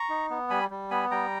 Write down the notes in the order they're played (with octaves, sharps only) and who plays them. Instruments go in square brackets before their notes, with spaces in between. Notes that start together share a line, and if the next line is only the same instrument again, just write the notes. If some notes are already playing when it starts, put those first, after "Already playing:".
Already playing: [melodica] A#5 C#6
D#4
B3
G3 G#5 B5
G3
B3 G#5 B5
G3 G5 A#5